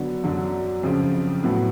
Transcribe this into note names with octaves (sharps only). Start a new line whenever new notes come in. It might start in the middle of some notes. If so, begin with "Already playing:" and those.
Already playing: D3 F#3 B3
F#2 D3 F#3
F2 C#3 F3
A2 F#3 B3